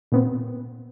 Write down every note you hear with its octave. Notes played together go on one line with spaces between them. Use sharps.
A#2 B3 C4